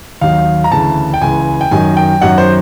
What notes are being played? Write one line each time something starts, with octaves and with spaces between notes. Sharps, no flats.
D#2 D#3 F#3 F5
A#5
D2 C#3 E3 A5
G5
C#2 C#3 E3 G#5
G5
F#2 D#3 F#3 G#5
G5
F#2 D#3 F#3 F#5
C5